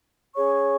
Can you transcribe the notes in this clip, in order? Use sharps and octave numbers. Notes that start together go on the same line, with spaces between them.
C#4 G#4 C#5 C#6